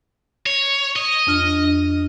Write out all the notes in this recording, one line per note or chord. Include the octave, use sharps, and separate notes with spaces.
C#5
D#5
F2 D4 F6